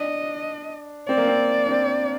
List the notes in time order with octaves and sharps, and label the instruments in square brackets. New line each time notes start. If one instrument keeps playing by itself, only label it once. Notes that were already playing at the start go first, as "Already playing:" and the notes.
Already playing: [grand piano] D4 [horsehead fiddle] D#5
[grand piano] C4 [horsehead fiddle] D5
[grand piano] A#3
C4
D4
C4